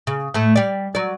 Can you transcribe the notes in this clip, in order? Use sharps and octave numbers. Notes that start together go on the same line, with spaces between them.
C#3
A2 A3
G3 D5
F#3 D5